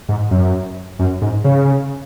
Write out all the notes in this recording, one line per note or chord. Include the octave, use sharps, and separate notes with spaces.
G#2
F#2
F#2
G#2
C#3